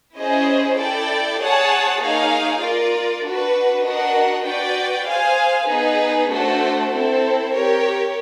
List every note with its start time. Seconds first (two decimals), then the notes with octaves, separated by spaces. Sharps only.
0.16 C#4 E4 G#4 C5 D#5
0.77 E4 A4 D5 G5
1.39 G#4 C#5 F#5 A5
2.00 A#3 D#4 G#4 C#5 F5
2.62 F4 A#4 D5
3.23 D4 F#4 B4
3.84 D4 F#4 A#4 D#5 F#5
4.45 F#4 B4 D5 G5
5.07 G#4 C5 F5 G#5
5.68 B3 D#4 G#4 B4
6.30 A3 D4 F#4 A4 C5
6.91 C4 E4 A4 C5
7.52 G4 A#4 C#5